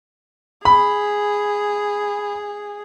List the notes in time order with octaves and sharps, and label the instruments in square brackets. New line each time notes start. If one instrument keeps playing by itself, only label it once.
[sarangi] G#4 [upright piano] B5